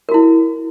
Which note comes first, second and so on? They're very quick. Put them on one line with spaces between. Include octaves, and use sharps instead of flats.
A#4 F#4 E4